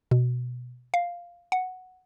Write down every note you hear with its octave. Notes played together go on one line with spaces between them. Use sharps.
B2
F5
F#5